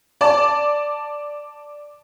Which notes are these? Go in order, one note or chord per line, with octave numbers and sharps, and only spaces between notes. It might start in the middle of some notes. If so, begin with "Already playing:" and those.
D5 A5